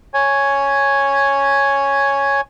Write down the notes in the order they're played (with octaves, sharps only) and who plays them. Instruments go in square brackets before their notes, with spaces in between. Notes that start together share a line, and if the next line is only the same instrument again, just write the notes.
[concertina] C#5 G#5